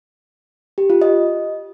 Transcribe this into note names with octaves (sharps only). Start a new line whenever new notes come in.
G4
F4
D#5